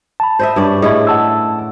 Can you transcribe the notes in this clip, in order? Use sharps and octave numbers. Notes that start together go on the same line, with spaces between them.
A5 B5
C5 D#5 E5
G2 C#4 D5
A2 A3 E4 G#4 D#5
F#5 A5 E6